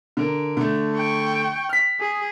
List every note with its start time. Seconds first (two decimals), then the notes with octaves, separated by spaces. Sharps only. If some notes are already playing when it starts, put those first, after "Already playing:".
0.17 D3 A#4
0.57 D3 A3
0.97 G5 C#6
1.69 F6 B6
2.00 G#4